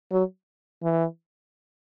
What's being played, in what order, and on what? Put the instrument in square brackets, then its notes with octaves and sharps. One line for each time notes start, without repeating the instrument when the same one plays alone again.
[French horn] F#3
E3